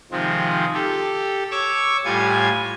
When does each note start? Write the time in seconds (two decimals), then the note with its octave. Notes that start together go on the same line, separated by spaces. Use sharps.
0.11 C3 D#3 F3 G#3 C4
0.74 G4 A4
1.51 C#5 C#6 D6 E6
2.05 A2 G3 F4 G#5 G#6